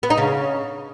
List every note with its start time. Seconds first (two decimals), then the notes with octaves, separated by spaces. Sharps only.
0.03 B3
0.10 D#4
0.18 C#3